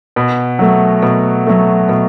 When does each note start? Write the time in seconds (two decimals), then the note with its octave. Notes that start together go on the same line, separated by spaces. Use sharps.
0.16 B2
0.59 F#3 A3
1.03 B2
1.47 F#3 A3
1.89 B2